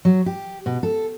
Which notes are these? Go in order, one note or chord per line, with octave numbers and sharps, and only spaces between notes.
F#3
G4
B2
A4